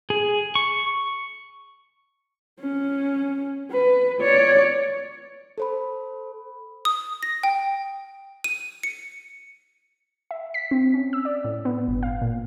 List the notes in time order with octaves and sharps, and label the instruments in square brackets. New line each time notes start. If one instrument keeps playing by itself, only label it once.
[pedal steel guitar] G#4
C#6
[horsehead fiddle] C#4
B4
C#5 D5
[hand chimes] A4 C5 B5
[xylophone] D#6
A#6
G5
D#7
C#7
[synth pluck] E5
B6
C4
C#4
E6
D5
A2
B3
G1
F5
A#2